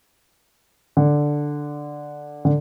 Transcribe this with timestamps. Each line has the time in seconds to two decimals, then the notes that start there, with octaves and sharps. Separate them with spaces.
0.97 D3
2.45 D3